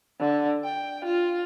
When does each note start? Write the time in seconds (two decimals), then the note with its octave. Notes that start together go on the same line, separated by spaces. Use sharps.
0.20 D3
0.64 G5
1.05 F4